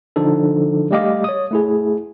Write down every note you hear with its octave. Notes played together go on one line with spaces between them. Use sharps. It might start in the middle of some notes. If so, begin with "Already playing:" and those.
D3 F3 D4 D#4 A4
G3 A3 G4 D#5 F5 D6
C#5 D#6
A3 E4 G#4